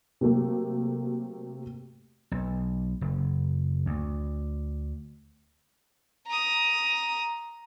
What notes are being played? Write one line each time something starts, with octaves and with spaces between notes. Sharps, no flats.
C3 F#3 A3 A#3
B1
F#1
D2
A#5 D#6